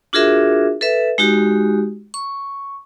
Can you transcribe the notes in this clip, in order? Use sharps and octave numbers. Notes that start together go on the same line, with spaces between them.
D4 F4 F#4 G#4 A#4 E5
A4 B4 E5
G#3 D#4 F#4 G4
C#6